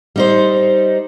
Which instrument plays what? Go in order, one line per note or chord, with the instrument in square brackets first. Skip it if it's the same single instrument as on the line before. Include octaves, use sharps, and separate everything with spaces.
[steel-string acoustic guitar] G3 D#4 C5